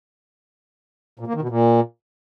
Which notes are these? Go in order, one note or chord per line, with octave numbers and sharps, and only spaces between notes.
A#2
A#3
D#3
B2
A#2